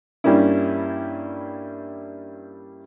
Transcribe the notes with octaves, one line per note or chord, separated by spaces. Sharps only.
G2 G3 A#3 C#4 E4